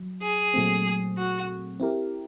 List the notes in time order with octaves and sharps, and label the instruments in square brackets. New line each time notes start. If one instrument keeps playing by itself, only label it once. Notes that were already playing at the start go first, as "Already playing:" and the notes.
Already playing: [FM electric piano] F#3
[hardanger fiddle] G#4
[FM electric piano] A#2 F#3 A3 C4
[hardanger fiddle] F#4
[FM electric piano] C4 E4 G4 A#4